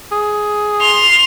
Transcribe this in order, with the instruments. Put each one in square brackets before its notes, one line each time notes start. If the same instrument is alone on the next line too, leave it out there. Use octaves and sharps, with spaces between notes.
[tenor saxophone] G#4
[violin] C6 F7